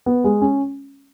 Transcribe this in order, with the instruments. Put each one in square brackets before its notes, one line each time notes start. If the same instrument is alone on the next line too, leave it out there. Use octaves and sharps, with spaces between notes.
[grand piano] B3
G#3
C#4